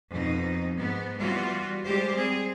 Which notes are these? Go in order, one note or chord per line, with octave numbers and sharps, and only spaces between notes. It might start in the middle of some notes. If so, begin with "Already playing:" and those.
F2 B2 D#4
G#2 B3
E3 G3 B3 F4 F#4
G3 G#3 G4 C5
C4 G#4